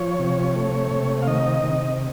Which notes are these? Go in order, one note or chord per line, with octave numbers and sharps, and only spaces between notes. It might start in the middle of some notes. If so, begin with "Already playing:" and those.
Already playing: F3 C#5
C3
A3
C3
F5
D#3 D#5
C3